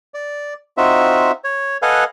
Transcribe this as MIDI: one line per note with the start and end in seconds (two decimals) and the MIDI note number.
0.14 0.54 74
0.77 1.32 60
0.77 1.32 63
0.77 1.32 65
0.77 1.32 66
0.77 1.32 76
1.44 1.77 73
1.82 2.04 69
1.82 2.04 71
1.82 2.04 75
1.82 2.04 77
1.82 2.04 78
1.82 2.04 80